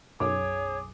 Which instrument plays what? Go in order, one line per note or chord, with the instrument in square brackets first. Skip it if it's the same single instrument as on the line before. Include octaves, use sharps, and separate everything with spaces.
[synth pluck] B1 F#2 [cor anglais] G#4 [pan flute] C#5 [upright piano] D6